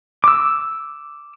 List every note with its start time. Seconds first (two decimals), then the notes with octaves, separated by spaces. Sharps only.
0.24 D6 E6